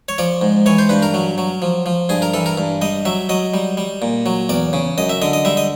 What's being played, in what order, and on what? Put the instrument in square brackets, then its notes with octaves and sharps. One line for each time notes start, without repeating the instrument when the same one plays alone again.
[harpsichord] C#5
F3 D5
G#2
E3 C#5
C5
G2 B4
A#4
F#3
F#3
F3
F3
G2 G#4
A#4
E3 A4
A#4
G2
G3 D#5
F#3 E5
F#3 D#5
G3
G3
A#2
F#3
E2 D5
C#3
F#2 D#5
E5
D3 D#5
D#5
G3 E5
D#5